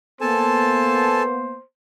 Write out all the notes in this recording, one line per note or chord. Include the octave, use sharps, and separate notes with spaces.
A#3 B3 A4 C5 G#5 A5